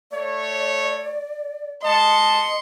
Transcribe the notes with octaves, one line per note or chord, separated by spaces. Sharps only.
A3 C#5 D5
G#3 D#5 A5 C6 C#7